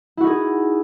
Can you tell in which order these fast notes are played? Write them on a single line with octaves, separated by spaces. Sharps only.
E4 F#4 D#4 G#4